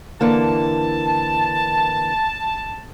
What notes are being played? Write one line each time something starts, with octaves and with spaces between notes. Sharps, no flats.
D3 E3 A#3 A5